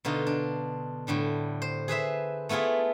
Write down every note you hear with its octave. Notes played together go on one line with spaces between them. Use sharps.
B2 D3 D#4 F4
D4
A2 D3 G3 D4
C5
G#4 B4 C5 E5
A3 B3 E4 F4 G#4